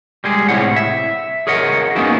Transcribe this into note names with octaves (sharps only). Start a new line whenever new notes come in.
G3 G#3 G#4
A2 C3 F3 E4 C#5 F#5
E5
G#4 A#4 C#5 D#5 F#5
A#3 B3 C#4 D#4 E4 F#4